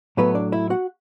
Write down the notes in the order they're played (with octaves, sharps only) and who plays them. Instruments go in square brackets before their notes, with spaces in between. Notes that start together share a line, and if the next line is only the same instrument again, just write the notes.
[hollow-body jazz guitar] A2 F#3 A3 B3 B4
D4 D5
E4 E5
F#4 F#5